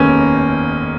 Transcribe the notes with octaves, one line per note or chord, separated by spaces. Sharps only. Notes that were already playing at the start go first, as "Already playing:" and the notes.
Already playing: F1 D#2 D#3 G#3 A#3 B3 C#4